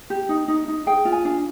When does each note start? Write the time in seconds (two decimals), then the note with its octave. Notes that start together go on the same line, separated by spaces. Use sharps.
0.10 G4
0.29 D#4
0.48 D#4
0.68 D#4
0.86 G#4 G5
1.05 F4
1.12 G#5
1.25 D4